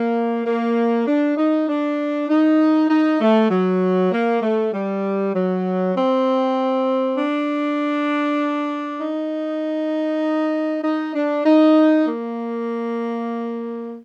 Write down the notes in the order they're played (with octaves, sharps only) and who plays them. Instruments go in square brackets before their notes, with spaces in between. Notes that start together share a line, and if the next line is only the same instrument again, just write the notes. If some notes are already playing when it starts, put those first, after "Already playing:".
Already playing: [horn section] A#3
A#3
D4
D#4
D4
D#4
D#4
A3
F#3
A#3
A3
G3
F#3
C4
D4
D#4
D#4
D4
D#4
A#3